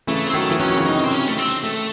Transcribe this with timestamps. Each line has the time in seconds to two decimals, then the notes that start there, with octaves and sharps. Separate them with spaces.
0.07 C#3 E3 A3
0.27 C4
0.33 D#3 F#3 A3
0.50 E3
0.60 D#3 F#3 C#4
0.71 F#3
0.77 C#3 E3
0.86 D#4
0.94 C3 D#3
1.04 C4
1.12 C#4
1.28 A3
1.38 C4
1.63 A3